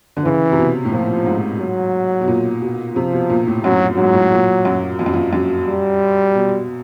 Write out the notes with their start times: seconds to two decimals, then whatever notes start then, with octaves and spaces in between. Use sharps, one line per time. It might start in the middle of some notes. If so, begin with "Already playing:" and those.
0.17 D3
0.24 C#3 E3
0.52 C3
0.58 B2
0.85 A2
0.92 A#2 F3
1.26 G#2
1.60 F#3
2.21 B2
2.28 A#2
2.62 B2
2.96 C3 F3
3.13 B2
3.30 A#2
3.47 A2
3.64 F#2 F#3
3.97 G#2 F#3
4.14 A2
4.32 A#2
4.65 F#2
4.99 F2
5.06 F#2
5.14 F2
5.33 F#2
5.67 G3
6.35 B2